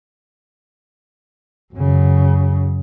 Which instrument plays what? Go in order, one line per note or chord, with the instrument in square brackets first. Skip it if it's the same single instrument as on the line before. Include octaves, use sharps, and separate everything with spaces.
[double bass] F#2 C#3